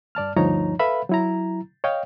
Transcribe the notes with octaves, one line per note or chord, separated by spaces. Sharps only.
G2 D5 A5 F6
D2 G2 F3 D#4 C#5 A#5
A4 B4 E5 F5 B5
F#3 E4 A#5
C#5 D#5 F5 G5